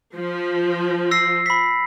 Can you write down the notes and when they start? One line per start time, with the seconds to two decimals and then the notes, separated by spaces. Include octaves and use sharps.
0.16 F3
1.11 E6 A#6 C7
1.46 B5 B6